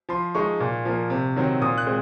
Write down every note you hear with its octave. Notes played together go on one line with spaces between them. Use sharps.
F3 C6
G#3 D#4 C#6
A#2
F3 A#3
C3
D#3 F#3 C4
A#2 D#6
F#6
G#3 C4